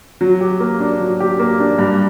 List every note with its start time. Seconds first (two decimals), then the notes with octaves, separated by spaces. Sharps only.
0.21 F#3
0.41 G4
0.60 A#3
0.80 D4
1.00 F#3
1.20 G4
1.39 A#3
1.60 D4
1.79 G2